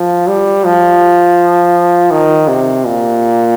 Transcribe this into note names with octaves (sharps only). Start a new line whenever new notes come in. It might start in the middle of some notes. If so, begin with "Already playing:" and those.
Already playing: F3
G3
F3
D#3
C3
A#2